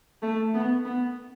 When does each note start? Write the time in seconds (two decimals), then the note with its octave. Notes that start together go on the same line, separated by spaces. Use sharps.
0.22 A3
0.54 B3
0.85 B3